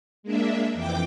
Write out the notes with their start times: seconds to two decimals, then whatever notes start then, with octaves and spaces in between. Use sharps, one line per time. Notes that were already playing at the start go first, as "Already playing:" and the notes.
0.23 G#3 A#3 D4 E5
0.73 F2 E3 G5 D6